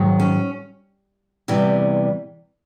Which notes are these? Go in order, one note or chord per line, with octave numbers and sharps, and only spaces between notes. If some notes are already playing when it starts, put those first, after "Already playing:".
Already playing: G#2 D#3 F#3
C#4
E2 C3 E3 G3